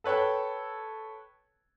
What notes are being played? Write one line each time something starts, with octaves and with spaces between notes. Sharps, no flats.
A4 B4 C#5 G5 A5